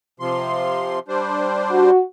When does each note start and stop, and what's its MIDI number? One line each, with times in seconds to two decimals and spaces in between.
0.20 0.99 48
0.20 0.99 53
0.20 0.99 84
1.08 1.91 55
1.08 1.91 62
1.08 1.91 72
1.70 1.99 66